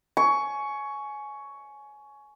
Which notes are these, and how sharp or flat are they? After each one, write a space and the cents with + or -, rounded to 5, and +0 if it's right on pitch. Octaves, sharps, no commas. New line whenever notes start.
G#5 +20 C#6 +10